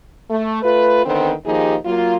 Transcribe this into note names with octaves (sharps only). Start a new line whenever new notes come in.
A3
A3 F4 B4
D3 D#3 B3 C4
D#2 F3 D#4 G4 G#4
F#3 A#3 F4